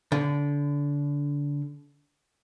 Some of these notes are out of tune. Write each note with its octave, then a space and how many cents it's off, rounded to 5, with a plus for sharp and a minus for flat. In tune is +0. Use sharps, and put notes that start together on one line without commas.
D3 -25